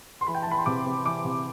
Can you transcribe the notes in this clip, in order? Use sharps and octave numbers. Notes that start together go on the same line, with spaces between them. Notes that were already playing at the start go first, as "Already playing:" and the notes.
C6
E3 B5
G5
A5
E3
B5
C6
C3 D6
C3
E3 D6
C3